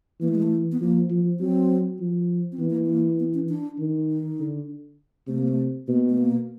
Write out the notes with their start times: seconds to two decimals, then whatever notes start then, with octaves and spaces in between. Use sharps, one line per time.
0.21 E3 A#3
0.28 A3
0.35 G#3
0.42 A3
0.72 B3
0.81 F3 A#3
1.10 F3
1.40 F#3 C4
2.00 F3
2.52 C4
2.60 E3 B3
2.70 A#3
2.85 B3
2.90 A#3
3.19 B3
3.34 C#4
3.49 D4
3.79 D#3
4.09 D#4
4.39 D3
5.28 C3 A3
5.38 A#3
5.48 A3
5.88 B2 A#3
6.09 A3
6.18 A#3